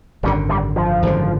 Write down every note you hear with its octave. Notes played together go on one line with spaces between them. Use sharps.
G#1 F#2 D3 G3
G3
F3
G#1 F#2 D3